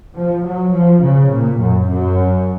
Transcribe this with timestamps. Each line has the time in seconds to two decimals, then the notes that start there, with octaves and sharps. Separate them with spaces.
0.14 F3
0.43 F#3
0.72 F3
1.01 C#3
1.30 A#2
1.59 F#2
1.88 F#2